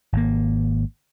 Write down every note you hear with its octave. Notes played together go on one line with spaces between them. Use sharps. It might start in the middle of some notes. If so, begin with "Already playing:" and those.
G#1 A#3